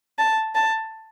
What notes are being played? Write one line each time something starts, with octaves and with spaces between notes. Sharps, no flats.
A5
A5